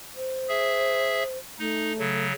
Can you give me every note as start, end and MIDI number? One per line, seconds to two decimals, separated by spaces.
0.16 1.38 72
0.49 1.23 68
0.49 1.23 76
1.59 2.27 57
1.59 1.92 63
1.99 2.33 49
1.99 2.33 54